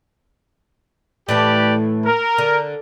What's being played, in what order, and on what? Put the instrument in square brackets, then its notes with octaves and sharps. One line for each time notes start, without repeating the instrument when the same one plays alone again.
[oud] A2 E3 A3 [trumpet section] G4 B4 D5
[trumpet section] A#4
[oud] D3